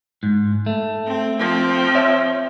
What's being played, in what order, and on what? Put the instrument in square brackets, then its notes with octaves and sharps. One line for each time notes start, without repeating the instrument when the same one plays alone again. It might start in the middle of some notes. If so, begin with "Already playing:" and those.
[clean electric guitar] G#2
A3
[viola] C4
F3 C4
[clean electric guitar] C#5 E5